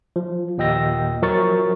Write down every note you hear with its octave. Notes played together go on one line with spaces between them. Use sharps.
F3
D#2 A#2 D#5 G5 E6 A#6
F3 F#3 A#4 C#6 A6